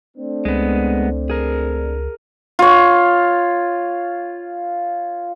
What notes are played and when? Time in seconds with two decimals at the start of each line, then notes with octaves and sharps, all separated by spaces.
0.17 A3 C4 D4
0.45 C#2 G#3 B3
1.30 G#4 A#4
2.59 F4 C#5